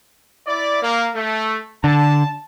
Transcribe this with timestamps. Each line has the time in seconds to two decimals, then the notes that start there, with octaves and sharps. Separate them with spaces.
0.47 E4 D5
0.82 A#3
1.14 A3
1.84 D3 A5